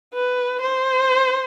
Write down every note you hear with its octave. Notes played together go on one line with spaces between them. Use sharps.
B4
C5